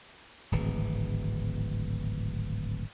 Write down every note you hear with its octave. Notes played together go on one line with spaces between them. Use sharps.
D1 G#1 E3